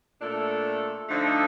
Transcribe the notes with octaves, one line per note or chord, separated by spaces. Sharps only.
A#2 A3 D4 A4
D3 F3 A3 D#4 A4